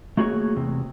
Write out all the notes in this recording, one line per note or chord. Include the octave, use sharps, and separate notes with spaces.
A3 A#3 F#4 G#4 B4 C#5
E2 C3